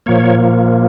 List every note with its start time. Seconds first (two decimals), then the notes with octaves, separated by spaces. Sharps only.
0.06 A#2 F3 A#3 C#5